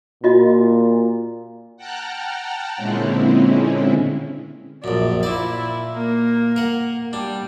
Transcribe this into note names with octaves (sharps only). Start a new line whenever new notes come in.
A#2 F4 F#4 D#5
F#5 G5 A5 A#5 F6 F#6
A#2 D3 G#3 C4 C#4 E4
A#1 F#2 D5
A#2 E4 D5
A#3
A#4 F#5
G3 D4